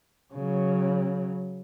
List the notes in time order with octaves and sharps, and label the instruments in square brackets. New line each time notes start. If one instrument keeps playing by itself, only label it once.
[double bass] C#3 F#3